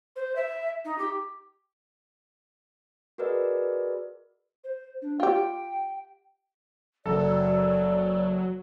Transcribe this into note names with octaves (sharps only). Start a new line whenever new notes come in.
C5
E5
D#4
G4
F#4 G#4 A#4 B4 D5 D#5
C5
D4
F4 G4 G5
F#1 F#3 A4 D5